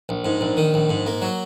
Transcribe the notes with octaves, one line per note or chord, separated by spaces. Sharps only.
A#1
G#2
A#1
D#3
A#1
G#2
A#3
F#3